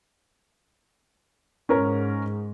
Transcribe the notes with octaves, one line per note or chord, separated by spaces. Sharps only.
G#2 C#4 A#4